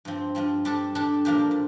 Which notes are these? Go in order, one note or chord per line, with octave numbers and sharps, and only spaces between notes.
G2 F3 C4
G2 F3 C4
G3 D4 A4
G3 D4 A4
A#2 F3 A#3 D4 G4
A#2